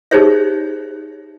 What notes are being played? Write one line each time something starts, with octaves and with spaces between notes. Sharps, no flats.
D#4 G4 G#4 C5 C#5 E5